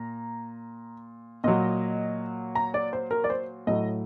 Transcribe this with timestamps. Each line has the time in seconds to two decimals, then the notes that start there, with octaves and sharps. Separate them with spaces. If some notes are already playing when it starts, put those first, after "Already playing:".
Already playing: A#2 A#5
1.44 A#2 F#3 D#5
2.55 A#5
2.74 D5
2.93 C5
3.11 A#4
3.24 D5
3.30 C5
3.67 A2 F#3 D#5